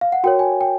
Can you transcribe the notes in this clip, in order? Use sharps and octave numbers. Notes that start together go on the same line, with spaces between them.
F5
F#5
F#4 A#4 C#5 G5
G#5
G5